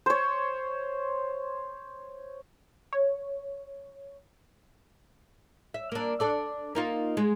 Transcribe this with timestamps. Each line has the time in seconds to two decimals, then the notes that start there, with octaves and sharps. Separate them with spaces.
0.06 C5 C#5
2.93 C#5
5.74 E5
5.92 A#3 D4
6.20 D4 A4 D5
6.75 A#3 D#4 F4
7.17 G#3